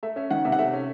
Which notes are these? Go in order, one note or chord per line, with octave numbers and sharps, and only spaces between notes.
A3 E5
C#4 E5
D#3 F#5
C3 E5
F#5
A3 E5
C#4